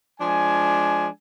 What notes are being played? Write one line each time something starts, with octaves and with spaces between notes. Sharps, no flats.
F3 G#3 D4 G#5